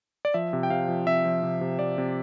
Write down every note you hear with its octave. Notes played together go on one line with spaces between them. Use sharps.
D5
F3 E5
C3
G5
C3 F5
F3
C3 E5
F3
C3
C3
F3 D5
C3